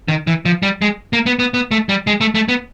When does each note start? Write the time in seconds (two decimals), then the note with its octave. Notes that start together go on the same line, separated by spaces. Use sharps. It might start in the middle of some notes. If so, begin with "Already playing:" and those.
0.08 D#3
0.27 E3
0.45 F3
0.63 G3
0.82 G#3
1.13 A#3
1.26 B3
1.39 B3
1.54 B3
1.71 A3
1.89 G3
2.07 G#3
2.21 A3
2.35 A3
2.48 B3